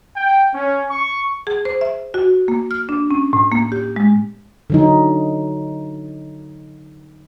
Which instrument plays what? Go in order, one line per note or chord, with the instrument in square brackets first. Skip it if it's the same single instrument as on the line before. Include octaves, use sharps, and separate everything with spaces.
[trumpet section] G5
C#4
C#6
[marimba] G#4
C5
E5
F#4
A#3
F6
D4
C#4
A2
A#3
G4
G#3
[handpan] D3 F#3 D#4